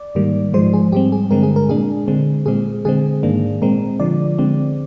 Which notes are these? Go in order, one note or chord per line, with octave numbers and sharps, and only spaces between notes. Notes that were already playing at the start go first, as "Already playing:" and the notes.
Already playing: D5
G#2 D#3 G3 A#3
G#2 F3 G#3 C5
G#4
G#2 G3 C4 G4
G#4
G2 D3 G#3 C4 A#4
G#4
A#4
A#2 G#3 D4 G#4
D3 G#3 C4
A#2 G#3 C4 G#4
D3 G#3 C4 G#4
G#2 D#3 A#3 D4
A#2 G#3 C4 A#4
D3 F3 G#3 D5
D3 G#3 C4